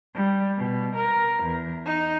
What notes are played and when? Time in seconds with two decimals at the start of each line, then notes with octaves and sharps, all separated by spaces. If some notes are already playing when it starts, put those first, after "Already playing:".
0.15 G3
0.56 B2
0.95 A#4
1.43 E2
1.86 D#4